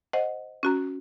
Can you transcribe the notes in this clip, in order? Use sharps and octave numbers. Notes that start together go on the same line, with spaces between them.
C5 D#5 F#5
C#4 F#4 A#5